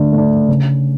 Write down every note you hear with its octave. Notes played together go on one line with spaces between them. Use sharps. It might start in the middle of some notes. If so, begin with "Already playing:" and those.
Already playing: D3 A3 D4
A3
D4
C#3